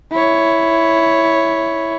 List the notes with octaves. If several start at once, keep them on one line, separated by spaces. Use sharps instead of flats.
E4 C#5